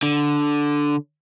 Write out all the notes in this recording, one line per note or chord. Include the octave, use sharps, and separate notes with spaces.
D3